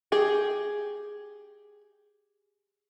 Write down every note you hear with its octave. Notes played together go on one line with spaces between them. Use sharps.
G4 G#4